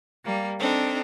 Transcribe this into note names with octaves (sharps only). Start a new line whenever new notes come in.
G3 A#3
C4 D4 D#4 A4